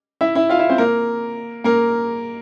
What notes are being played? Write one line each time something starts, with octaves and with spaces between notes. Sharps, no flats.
E4 E5
E4 E5
F4 F5
E4 E5
C4 C5
A#3 A#4
A#3 A#4